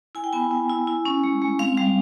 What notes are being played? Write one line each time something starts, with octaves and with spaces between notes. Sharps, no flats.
E4 G#5
G5
B3 G#5
E4
E4
E4
C#4
G#3
G#3
C4 F5
G3 F5